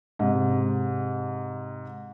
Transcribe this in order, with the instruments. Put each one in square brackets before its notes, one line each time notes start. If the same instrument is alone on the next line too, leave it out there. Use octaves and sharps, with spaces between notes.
[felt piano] G#2 C3